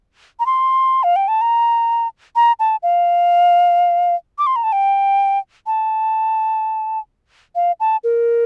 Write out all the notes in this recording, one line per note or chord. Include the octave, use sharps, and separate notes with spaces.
A#5
C6
F5
G5
A5
A#5
A#5
A5
F5
D6
C6
A#5
A5
G5
A5
F5
A5
A#4